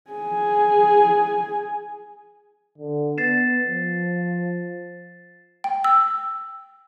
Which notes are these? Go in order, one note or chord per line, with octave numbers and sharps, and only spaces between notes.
G#4 G#5
D3
B3 A6 C7 E7
F3
G5
E6